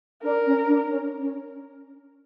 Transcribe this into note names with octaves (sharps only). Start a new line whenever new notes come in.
D4 A#4
C#4
D4
C#4
C#4